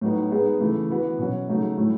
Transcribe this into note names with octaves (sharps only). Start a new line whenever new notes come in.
A2 F#3 B3 D#4
G#3 B3 D#4 G#4
C#3 E3 A3
E3 B3 F#4
B2 F#3 C#4
C#3 F#3 A3 D#4
A2 F#3 A3 E4